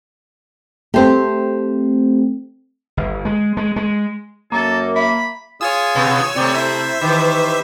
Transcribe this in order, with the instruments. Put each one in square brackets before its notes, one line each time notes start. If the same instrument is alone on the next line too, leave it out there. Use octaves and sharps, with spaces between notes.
[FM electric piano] A3 C4 [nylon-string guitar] G4 C5
[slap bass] G1
G#3
G#3
G#3
[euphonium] F#2 [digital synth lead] A#3 [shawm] A4
[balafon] E5 [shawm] B5
[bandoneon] F4 G#4 D#6 [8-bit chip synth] C#5 G#5 E6
[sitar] B2 B3
[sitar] C3 A3 [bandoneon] C4 D5 G5
[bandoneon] E4 [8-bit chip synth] C5 E5
[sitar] D#3 E3 [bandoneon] G4 B4